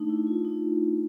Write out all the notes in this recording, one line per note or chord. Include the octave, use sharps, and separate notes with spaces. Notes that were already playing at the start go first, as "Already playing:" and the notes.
Already playing: A3 D4 D#4
E4
F4
D#4